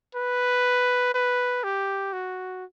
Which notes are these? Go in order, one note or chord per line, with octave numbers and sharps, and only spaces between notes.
B4
B4
G4
F#4